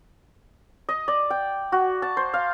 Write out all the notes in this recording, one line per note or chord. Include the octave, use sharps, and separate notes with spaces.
D#5
D5
G5
F#4
A5
C5
F5